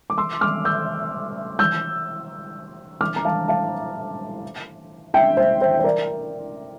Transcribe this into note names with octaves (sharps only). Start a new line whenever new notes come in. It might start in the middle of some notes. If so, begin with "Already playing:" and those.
D6
C6 E6
D6 F6
E6 G6
E6 G6
D6 F6
A#5
F5 A5
F5 A5
E5 G5
C5 E5
C5 E5
C5
A#4 D5